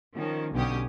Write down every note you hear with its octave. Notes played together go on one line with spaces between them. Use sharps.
D#3 F3 C#4
B1 B2 D3 C#4 G4 D#6